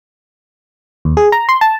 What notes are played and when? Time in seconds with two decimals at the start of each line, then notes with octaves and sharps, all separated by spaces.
1.05 D#2
1.17 G#4
1.32 A#5
1.49 C6
1.61 A5